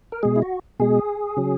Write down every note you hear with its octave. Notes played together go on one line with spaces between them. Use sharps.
A#4
B2 G#3 G#4
E4
F#4
B2 G#3 G#4
C#3 F#3